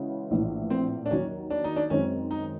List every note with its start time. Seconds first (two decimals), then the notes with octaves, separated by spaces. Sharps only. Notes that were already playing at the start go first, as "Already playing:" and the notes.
Already playing: C#3 E3 G#3 C#4 F#4
0.31 A#1 A2 E3
0.70 C4
1.06 D4
1.10 D#2 D#3 F#3 C#4
1.50 D4
1.64 D#4
1.76 D4
1.90 F#2 D#3 G#3 C4 C#4
2.31 D#4